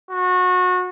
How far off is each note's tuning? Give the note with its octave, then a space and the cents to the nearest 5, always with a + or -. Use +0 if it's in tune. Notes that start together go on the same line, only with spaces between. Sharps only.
F#4 -25